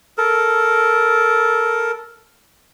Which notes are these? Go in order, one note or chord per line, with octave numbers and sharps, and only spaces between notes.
A4 A#4